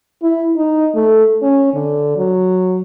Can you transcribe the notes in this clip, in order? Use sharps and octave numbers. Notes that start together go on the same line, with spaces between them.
E4
D#4
A3
C#4
D3
F#3